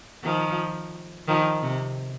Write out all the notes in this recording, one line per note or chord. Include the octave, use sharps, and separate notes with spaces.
D#3 F3
D#3 F3
C3